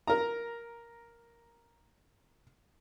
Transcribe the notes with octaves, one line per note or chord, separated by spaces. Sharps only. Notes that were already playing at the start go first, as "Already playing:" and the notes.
A#4 A#5